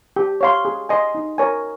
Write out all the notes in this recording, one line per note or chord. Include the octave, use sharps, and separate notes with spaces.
G4
C#5 F5 C6
G#4
D#5 G#5 C6
D#4
A#4 C#5 G#5